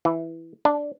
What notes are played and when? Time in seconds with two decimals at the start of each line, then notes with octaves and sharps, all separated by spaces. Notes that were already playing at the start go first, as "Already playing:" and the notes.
0.05 E3
0.65 D4